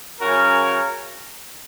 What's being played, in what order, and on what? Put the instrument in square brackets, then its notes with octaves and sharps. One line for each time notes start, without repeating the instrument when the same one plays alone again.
[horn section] C#3 F#3 C#4 F#4 A#4